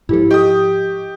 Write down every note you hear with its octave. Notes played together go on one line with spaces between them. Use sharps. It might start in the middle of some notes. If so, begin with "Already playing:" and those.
G#2 F3 E4 G4 A4
G4 D#5 C#6 D#6